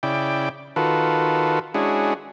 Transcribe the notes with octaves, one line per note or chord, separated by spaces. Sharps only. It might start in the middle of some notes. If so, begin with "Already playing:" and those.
C#3 E4 D5 G5
D#3 F4 F#4 A4 B4
G#3 C#4 D4 E4 F#4 G#4